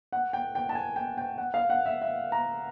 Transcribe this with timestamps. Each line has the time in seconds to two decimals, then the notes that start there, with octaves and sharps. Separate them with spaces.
0.12 F#5
0.33 G5
0.55 G5
0.69 A5
0.75 G#5
0.96 G5
1.18 G5
1.38 F#5
1.54 F5
1.70 F#5
1.86 E5
2.02 E5
2.32 A#5